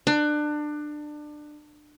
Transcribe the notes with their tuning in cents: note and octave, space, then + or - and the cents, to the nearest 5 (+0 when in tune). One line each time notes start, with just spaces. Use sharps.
D4 +25